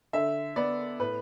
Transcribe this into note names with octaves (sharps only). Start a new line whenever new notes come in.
D3 E5
B3 D5
A2 B4